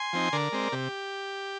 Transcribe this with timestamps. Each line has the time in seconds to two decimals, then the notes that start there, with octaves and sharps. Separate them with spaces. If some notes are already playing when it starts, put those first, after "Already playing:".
Already playing: G#5 C6
0.13 F3 C4 D#4
0.33 D3 A#4 D5
0.52 G#3 C4
0.72 C3 G4